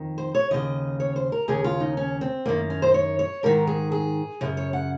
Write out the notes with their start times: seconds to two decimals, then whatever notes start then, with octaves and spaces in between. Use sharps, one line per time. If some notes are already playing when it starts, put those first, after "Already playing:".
Already playing: F2 D#3
0.18 C5
0.34 C#5
0.51 D#2 C#3 D#5
1.00 C#5
1.16 C5
1.32 A#4
1.48 D#2 C#3 G#4
1.64 F4
1.80 D#4
1.97 C#4
2.21 C4
2.46 F#2 D#3 A#3
2.70 C#4
2.82 C5
2.94 C#5
3.19 C#5
3.43 G#2 D#3 A#4
3.67 G#4
3.92 G#4
4.41 F#2 C#3
4.57 C#5
4.73 F#5